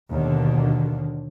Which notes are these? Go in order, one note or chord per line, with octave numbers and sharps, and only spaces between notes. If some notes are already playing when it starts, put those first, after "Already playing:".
D#2 B2 D3